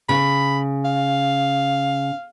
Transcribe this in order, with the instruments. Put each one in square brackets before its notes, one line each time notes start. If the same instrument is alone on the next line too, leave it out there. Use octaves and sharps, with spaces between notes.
[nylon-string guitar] C#3 [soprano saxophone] B5
[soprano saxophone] F5